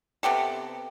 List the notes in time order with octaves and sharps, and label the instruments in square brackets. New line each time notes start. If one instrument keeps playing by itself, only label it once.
[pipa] C3 B3 G4 A4